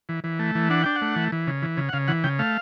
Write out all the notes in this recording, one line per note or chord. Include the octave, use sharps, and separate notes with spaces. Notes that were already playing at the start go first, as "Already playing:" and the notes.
E3
E3
A3
E3
D4 F#5
D4 G5
F#5
A3
E3
E3
C#3
E3
C#3
F#5
C#3 F5
E3 F#5
C#3 G5
A3 F5